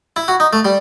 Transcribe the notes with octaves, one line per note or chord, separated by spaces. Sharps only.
E4
F#4
D#4
A3
G3